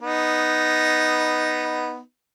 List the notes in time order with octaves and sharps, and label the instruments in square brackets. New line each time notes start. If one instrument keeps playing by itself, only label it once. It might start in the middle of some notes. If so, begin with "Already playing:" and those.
[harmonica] B3 D#4